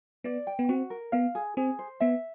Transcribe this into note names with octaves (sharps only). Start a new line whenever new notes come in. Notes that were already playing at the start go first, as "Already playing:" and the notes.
B3 D5
G5
B3
C4 F#4
A#4
B3 F5
G#4
C4 G#4
C5
B3 E5